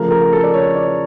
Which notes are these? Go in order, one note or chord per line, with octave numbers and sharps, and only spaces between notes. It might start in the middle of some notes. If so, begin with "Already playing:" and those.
Already playing: C#3 F3 A3 A#4
A#4
A4
D5
C#5
D5